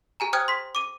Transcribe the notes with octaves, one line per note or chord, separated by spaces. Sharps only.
G4 G#5 A#5
C5 G5 D#6 F6 F#6 G#6
C6 B6
D6 D#7